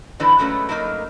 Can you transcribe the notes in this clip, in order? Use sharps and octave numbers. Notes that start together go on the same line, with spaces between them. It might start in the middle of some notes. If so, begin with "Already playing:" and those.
D3 E3 F3 G#3 D#4 B4
F#3 G#3 A3 C#4 B4
F#3 A3 A#3 D#4 A#4